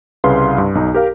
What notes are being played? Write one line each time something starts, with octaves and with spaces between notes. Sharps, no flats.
C2 C#3 B4 F5 C6
G2
B1 D#4
G4 A#4 F5